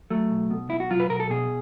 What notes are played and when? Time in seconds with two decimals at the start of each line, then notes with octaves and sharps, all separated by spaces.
0.10 F#3 A3
0.31 B1
0.50 B2
0.70 B1 E4
0.80 F#4
0.90 F#3 F4
1.00 B4
1.10 B1 A#4
1.20 A4
1.30 B2 G#4